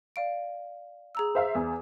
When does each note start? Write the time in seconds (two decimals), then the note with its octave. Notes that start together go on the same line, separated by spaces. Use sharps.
0.16 D5 F5 D7
1.15 G#4 A#5 E6
1.35 C5 E5 F5
1.55 E2